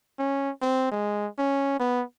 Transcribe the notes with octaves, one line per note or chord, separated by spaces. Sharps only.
C#4
C4
G#3
C#4
B3